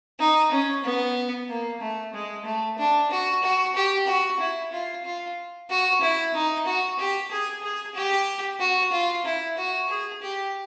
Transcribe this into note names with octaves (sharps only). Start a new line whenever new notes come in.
D#4
C#4
B3
A#3
A3
G#3
A3
D4
F#4
F#4
G4
F#4
E4
F4
F4
F#4
E4
D#4
F#4
G4
G#4
G#4
G4
F#4
F4
E4
F#4
G#4
G4